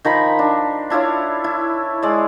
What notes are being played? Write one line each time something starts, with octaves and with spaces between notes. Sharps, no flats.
D#3 F3 A#5 B5
D4
D4 E4 F4 C#5
E4
G#3 D5